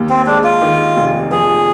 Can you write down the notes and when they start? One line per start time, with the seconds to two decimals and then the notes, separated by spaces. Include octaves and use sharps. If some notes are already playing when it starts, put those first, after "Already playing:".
Already playing: D#2
0.10 C4
0.26 G#3 D4
0.44 F4
0.62 D#3
0.97 F1
1.31 F3 G#4